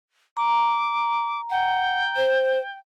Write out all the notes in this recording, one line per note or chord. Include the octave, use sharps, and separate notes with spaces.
A#5 D6
F#5 G5
C5